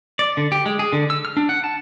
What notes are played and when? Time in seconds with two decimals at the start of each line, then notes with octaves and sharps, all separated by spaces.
0.19 D5
0.37 D3
0.52 G4
0.66 G#3
0.79 G#4
0.93 D3
1.10 E6
1.25 F6
1.37 D4
1.49 F#5
1.64 A5